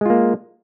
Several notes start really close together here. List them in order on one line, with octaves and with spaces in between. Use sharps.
G#3 F4 A#3